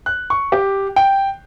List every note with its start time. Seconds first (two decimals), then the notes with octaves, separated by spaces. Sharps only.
0.06 F#6
0.30 C#6
0.52 G4
0.96 G5